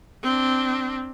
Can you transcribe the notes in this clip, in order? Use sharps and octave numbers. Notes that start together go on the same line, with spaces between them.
C4 D4